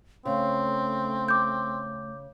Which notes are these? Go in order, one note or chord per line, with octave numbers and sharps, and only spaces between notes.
C#3 A3 C4
D6 G6